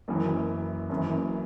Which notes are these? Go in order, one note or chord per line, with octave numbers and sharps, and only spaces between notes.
F#1 F#2 E3
F#1 F#2 E3